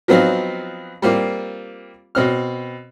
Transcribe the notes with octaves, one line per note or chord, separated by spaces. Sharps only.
F3 F#3 B3 C4 D#4 F5
G3 A#3 C4 F4
B2 C4 F6